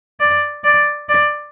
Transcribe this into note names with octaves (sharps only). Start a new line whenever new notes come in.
D5
D5
D5